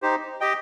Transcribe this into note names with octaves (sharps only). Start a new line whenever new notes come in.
D#4 G4 C5
G4 D#5 G5